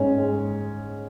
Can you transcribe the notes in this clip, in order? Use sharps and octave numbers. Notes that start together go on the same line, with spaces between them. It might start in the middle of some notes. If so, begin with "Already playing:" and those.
Already playing: G#2 C#4
G#3